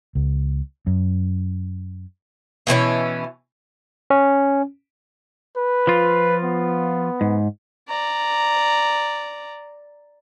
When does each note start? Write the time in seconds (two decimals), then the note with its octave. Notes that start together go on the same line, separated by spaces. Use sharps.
0.15 C#2
0.87 F#2
2.67 B2 E3 C4 C#4
4.10 C#4
5.57 B4
5.87 F3 F4
6.44 B3
7.21 G#2
7.89 D5 A#5